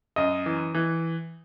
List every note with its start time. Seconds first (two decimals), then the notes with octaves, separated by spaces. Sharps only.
0.16 F#2 D#5
0.46 E3
0.75 E3